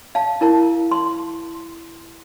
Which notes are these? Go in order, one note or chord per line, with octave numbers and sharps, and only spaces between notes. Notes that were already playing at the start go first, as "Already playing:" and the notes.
F5 A5
E4 A#4 A5
C6